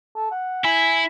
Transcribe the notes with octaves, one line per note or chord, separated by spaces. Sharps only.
A4
F#5
E4 G#5